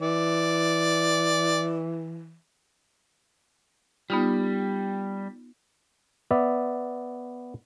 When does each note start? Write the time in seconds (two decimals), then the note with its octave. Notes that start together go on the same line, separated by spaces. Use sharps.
0.01 E3 D5
4.10 G3 B3 D#4 F4
6.31 B3 D5 E5